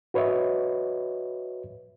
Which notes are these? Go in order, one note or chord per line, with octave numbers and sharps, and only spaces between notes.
F#4 B4 C#5 D#5 E5